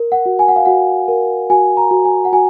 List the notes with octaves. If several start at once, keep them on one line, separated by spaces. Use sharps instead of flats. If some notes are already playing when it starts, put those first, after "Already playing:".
Already playing: A#4
F#5
F#4
G#5
F#5
F5
F#4 F#5
A#4
F#4 G#5
A#5
F#4
G#5
F#5
F#4 G#5